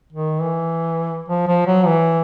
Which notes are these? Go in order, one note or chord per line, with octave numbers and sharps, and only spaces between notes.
D#3
E3
F3
F3
F#3
E3